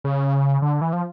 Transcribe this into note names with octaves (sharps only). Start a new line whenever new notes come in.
C#3
D3
E3
F3